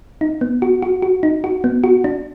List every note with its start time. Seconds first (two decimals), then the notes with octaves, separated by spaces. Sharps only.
0.21 D#4
0.41 B3
0.62 F#4
0.82 F#4
1.02 F#4
1.23 D#4
1.44 F#4
1.64 B3
1.84 F#4
2.04 D4